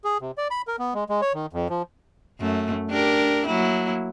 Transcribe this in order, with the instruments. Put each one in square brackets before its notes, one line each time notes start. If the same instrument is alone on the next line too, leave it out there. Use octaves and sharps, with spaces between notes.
[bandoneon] G#4
C3
D5
B5
A#4
B3
G#3
G#3
C#5
D#3
F2
F3
[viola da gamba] F#2 A3
D4 G4 A#4
F#3 A#3 E4